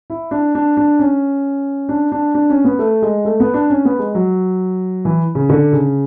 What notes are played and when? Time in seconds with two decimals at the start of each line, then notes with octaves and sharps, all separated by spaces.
0.10 E4
0.31 D4
0.55 D4
0.77 D4
0.99 C#4
1.89 D4
2.12 D4
2.35 D4
2.50 C#4
2.64 B3
2.79 A3
3.02 G#3
3.25 A3
3.40 B3
3.54 D4
3.70 C#4
3.85 B3
3.99 G#3
4.15 F#3
5.05 E3
5.35 C#3
5.50 D3
5.73 C#3